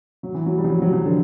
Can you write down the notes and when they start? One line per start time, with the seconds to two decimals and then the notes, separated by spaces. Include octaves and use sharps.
0.23 F#3
0.34 E3
0.46 F#3
0.58 G3
0.64 F3
0.70 F#3
0.82 F#3
0.93 F3
1.05 D3